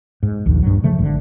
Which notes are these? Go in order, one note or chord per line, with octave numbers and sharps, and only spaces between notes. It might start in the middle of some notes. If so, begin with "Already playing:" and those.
G#2
A#1 D#2
G2 F#3
C#3 F3 A3
G#1 D3